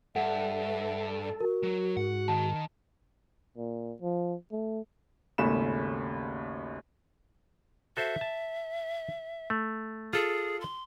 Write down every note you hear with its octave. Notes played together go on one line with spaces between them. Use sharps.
G2 A4 E5 F#5
F#4 A#4
F#3
G#2 F#5
D#3 A5
A#2
F3
A3
G#1 D#2 C#3 A3 B5 E7
F#4 A4 C5 E5
A5
A3
F4 G#4 A4
C6